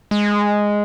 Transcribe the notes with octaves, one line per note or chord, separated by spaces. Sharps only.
G#3